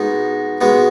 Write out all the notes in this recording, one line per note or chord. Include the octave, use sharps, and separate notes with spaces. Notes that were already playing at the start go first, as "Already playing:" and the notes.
Already playing: B2 G#3 B3 D#4
B2 G#3 B3